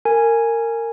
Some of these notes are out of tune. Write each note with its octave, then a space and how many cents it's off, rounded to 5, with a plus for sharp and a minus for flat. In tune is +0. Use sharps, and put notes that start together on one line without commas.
A#4 -20 G#5 +0